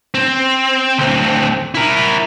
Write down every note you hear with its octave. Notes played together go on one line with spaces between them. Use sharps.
C4
D2 C4
E4 A#4